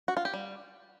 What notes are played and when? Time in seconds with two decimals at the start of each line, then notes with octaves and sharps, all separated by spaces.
0.08 F#4
0.17 F4
0.25 G4
0.34 G3